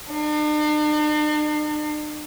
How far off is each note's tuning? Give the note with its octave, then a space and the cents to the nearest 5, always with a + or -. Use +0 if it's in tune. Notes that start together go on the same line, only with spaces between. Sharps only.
D4 +45